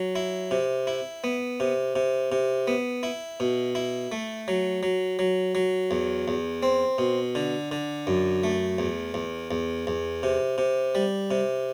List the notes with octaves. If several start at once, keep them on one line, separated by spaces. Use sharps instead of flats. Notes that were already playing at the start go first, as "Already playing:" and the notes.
Already playing: F#3
E4
C3
E4
B3
C3
C3
C3
B3
E4
B2
E4
A3
F#3
F#3
F#3
F#3
E2
E2
C4
B2
D3
D3
F#2
A3
E2
E2
E2
E2
C3
C3
G3
C3